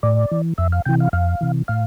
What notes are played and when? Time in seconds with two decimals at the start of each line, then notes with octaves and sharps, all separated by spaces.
0.03 A2 D5
0.31 E3
0.58 F2 E5
0.72 F5
0.86 C3 E3 G5
1.00 F5
1.13 F2 F5
1.41 C3 E3
1.68 A2 F5